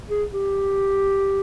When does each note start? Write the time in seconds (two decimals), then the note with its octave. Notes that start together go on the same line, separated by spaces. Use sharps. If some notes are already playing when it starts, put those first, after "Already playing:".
0.09 G#4
0.32 G4